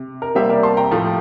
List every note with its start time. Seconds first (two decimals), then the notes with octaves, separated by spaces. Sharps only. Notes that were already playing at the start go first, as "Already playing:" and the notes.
Already playing: C3
0.22 A#4
0.35 C3 G3 A#3 C5 E5
0.49 A#4 D5
0.63 A5 C6
0.77 G5 A#5
0.91 A2 F3 A3